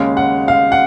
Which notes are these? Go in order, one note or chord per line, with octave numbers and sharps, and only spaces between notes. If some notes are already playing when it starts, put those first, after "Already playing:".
Already playing: D#2 C#3 G#3 C#4 F5
F#5
F5
F#5